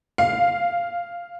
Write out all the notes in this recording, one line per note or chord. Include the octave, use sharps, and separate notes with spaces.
F5